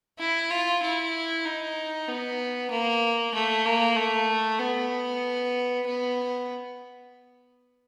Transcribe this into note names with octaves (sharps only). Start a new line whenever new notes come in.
E4
F4
E4
D#4
B3
A#3
A3
A#3
A3
B3
B3